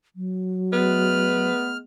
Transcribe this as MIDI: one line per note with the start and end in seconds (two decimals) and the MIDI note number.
0.16 1.51 54
0.73 1.82 56
0.73 1.82 57
0.73 1.82 59
0.73 1.71 71
0.73 1.77 89